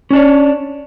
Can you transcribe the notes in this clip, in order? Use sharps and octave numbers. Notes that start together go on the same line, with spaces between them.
C#4 D4 C#5